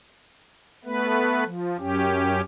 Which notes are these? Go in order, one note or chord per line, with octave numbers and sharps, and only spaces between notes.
A3 B3 B4
F3
F#2 C#4 G4